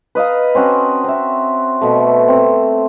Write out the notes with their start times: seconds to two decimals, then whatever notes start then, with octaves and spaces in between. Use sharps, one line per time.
0.15 B4 D#5 F5 A#5
0.55 C4 C#4 F#4 A5
1.04 C4 E5
1.81 B2 A3
2.28 C4